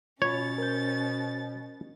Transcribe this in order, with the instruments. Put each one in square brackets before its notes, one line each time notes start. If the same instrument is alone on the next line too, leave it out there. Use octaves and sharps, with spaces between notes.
[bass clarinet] B2 [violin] C#4 A6 [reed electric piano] F4 B5 [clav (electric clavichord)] C#5
[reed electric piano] A#4 C5 G6